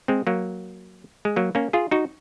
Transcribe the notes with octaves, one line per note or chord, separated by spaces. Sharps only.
G#3 C4
F#3 A#3
G#3
F#3 A#3
A#3 C#4
F4 G#4
D#4 F#4